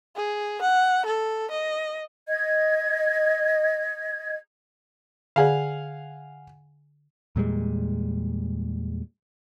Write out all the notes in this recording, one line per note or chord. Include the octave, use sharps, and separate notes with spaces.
G#4
F#5
A4
D#5
D#5 G#6
D3 G#4 D5 F5 F#5 G#5
E2 A#2 G3 G#3